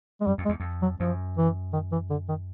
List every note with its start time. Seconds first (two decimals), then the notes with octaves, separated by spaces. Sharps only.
0.21 G#3
0.27 F#2 G3
0.38 F2
0.45 G#3
0.49 E2
0.60 F2
0.82 F#3
1.00 F#2 F3
1.37 E3
1.73 D#3
1.92 E3
2.10 D3
2.28 D#3